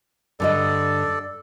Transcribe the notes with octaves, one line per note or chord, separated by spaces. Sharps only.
G2 D3 A4 D5 D#5